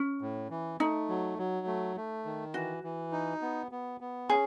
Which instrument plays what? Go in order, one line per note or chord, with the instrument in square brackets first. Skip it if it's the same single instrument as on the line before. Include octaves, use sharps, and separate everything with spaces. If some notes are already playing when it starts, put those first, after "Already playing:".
Already playing: [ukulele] C#4
[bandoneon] A2
E3
[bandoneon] A3 [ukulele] D#4
[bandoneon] F#3
F#3
A3
A3
D#3
[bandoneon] E3 [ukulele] F#4
[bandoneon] E3
D#4
B3
B3
B3
[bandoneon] C#4 [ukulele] G#4